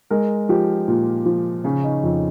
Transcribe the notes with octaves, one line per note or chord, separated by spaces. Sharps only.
G#3 A#4
F3 G4
A#2
F3
C#3 C#4
D#4
F2